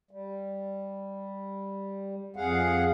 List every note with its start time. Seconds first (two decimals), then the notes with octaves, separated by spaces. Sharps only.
0.11 G3
2.36 F2 G#4 F5 F#5